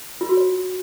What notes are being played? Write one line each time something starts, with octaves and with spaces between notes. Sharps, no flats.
F4
F#4
C#5